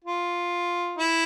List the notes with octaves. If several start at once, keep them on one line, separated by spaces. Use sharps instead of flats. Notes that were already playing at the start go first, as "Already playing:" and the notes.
F4
E4